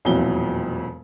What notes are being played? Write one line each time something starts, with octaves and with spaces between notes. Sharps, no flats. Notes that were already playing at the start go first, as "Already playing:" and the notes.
E1 F2 A#2 F#3 E4 G7